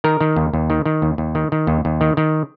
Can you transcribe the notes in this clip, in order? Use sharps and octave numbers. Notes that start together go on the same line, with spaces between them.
D#3 A#4
D#3
D#2
D#2
D#3
D#3
D#2
D#2
D#3
D#3
D#2
D#2
D#3
D#3